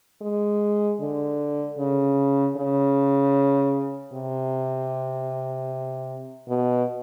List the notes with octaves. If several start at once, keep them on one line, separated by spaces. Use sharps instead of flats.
G#3
D3
C#3
C#3
C3
B2